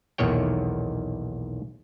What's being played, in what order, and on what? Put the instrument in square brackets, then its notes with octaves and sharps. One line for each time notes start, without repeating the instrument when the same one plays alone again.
[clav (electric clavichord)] B1 E2 A#2 D#3 C#5 G5